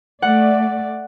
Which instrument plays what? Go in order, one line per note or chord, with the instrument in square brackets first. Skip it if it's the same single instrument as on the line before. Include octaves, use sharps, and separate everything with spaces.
[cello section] A3 D5 [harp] F#5